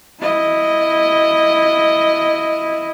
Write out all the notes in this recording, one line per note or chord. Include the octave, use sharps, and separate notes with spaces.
E4 D#5